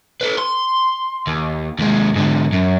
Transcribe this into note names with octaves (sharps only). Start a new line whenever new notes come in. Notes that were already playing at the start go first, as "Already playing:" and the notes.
A4 B4
C6
D#2
D#2 G#3
G#2 D3
F#2